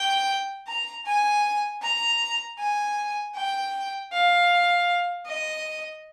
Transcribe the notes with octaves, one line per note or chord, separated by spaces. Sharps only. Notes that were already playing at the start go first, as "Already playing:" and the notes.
Already playing: G5
A#5
G#5
A#5
G#5
G5
F5
D#5